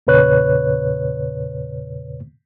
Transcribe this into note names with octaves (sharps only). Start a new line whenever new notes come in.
E2 A#2 C#3 B4 C#5 F#6